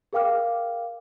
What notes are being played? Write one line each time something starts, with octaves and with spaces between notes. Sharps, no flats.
G#4 A#4 F5 G5 D6 F6